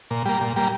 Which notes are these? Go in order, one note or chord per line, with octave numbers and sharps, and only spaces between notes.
A#2
G3 A#3
A#2
G3 A#3